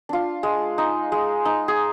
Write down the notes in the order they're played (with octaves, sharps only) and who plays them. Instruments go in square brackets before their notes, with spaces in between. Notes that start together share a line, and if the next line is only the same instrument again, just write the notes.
[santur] D4 F4
G#3
D#4
G#3
D#4
G#4